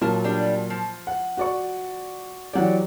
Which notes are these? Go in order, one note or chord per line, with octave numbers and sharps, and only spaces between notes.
A#2 F#3 F4 A#4 A5
G3 D4
F3
F#5
F#4 D5 C#6
E3 F#3 G4 D5 F#5